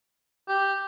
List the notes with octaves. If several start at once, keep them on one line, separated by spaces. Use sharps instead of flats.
G4